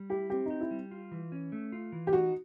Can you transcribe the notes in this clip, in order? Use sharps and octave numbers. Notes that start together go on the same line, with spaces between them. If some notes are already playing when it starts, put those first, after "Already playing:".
Already playing: G3
E4 G4
C4 G4
D#4 G4
E4
G3
F4
E3
C#4
A3
F4
E3
G4
D#4 F#4